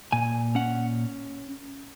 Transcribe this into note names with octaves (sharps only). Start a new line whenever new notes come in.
A#2 G#5
C#4 F#5